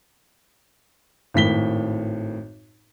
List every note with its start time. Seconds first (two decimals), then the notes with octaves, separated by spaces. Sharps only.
1.34 G#1 A2 B6 G7